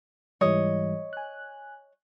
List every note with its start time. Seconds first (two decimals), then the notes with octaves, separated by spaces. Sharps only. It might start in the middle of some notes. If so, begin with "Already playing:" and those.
0.41 G#2 E3 G3 C#5 D#5
1.13 G#5 F#6